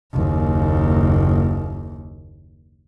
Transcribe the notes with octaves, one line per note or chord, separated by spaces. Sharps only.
F#1 D#2